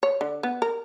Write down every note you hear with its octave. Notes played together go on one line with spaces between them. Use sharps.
C#5
D3
B3
A#4